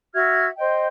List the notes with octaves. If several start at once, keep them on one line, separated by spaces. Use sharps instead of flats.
F#4 E5 F6 G#6
C5 D#5 G5